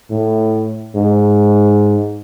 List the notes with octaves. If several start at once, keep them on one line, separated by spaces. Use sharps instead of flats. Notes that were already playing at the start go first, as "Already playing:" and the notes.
A2
G#2